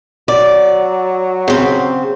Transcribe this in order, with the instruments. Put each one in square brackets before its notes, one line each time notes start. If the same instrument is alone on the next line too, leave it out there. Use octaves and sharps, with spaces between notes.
[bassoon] F#3 [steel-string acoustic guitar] D5
[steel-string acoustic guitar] C#3 C4